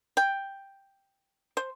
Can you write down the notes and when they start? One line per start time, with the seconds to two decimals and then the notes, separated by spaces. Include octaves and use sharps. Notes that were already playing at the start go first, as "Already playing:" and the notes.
0.17 G5
1.57 C5